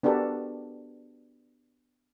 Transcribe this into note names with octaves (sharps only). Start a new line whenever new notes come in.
B3 D4 F#4 G4 A4 A#4